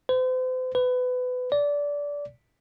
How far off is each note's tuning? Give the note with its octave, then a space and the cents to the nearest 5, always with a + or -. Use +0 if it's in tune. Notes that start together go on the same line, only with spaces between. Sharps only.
C5 -40
B4 +25
D5 -20